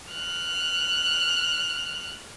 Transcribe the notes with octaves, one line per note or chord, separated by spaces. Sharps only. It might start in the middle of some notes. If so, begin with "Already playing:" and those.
F6 F#6